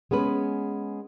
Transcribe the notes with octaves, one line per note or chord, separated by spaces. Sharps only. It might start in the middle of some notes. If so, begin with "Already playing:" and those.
G#3 B3 C#4 B4